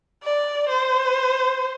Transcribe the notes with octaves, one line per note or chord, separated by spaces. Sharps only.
D5
C5